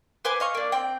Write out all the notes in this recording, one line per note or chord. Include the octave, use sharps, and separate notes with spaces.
B4 C5 G#5 D6
D#5 F5 C#6
A#3 D4
C4 G5